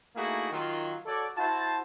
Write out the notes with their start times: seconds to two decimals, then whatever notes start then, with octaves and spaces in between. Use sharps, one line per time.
0.16 A3 A#3 D#4 E4 F#4 G#4
0.51 D#3 F#3 F4
1.06 F#4 A4 C#5 D5
1.37 E4 F#4 C5 A5